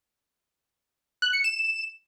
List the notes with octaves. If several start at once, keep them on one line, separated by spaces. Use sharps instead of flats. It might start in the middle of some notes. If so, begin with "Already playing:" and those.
F#6
C#7
E7